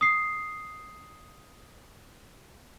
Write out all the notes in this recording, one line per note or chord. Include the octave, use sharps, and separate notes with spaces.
D#6 C7